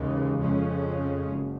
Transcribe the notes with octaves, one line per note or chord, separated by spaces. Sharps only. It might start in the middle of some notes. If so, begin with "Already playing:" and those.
Already playing: D#2 C#3 E3 G#3
F2 C#3 F3 G#3 C#4
F#1